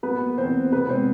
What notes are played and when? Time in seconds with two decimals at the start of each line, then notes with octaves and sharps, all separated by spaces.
0.03 F#3 B3 B4
0.21 A#3
0.38 E2 C4 C5
0.55 A#3
0.72 C3 B3 B4
0.89 G#3 C4 C5